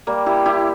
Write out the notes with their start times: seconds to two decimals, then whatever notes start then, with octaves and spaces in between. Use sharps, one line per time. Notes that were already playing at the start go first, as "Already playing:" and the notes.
0.07 G3 A#3
0.26 E4 G4
0.46 E4 G4